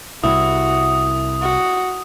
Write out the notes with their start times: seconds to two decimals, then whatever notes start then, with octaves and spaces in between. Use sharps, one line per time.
0.24 C2 E4 F#4 D#6
1.42 F#4